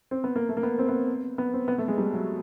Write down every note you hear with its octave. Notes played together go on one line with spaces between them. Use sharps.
C4
B3
A#3
A3
A#3
B3
C4
B3
B3
C4
B3
A3
G#3
G3
F#3